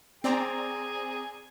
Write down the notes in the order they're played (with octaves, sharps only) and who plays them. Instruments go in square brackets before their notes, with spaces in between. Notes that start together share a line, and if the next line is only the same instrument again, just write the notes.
[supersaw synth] C4 D5 A#5 [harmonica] G#4 G#5